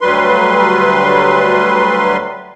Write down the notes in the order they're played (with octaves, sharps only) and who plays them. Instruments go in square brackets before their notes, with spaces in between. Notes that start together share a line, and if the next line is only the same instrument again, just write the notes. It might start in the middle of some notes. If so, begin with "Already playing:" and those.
[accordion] D2 F#3 G3 B4 C6